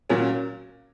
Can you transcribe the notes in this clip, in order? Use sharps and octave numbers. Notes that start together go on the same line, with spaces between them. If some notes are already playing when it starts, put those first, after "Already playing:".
A#2 F#3 C#4